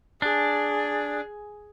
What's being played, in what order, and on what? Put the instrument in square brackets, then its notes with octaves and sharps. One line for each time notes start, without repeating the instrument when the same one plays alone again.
[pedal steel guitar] D4 [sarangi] G#4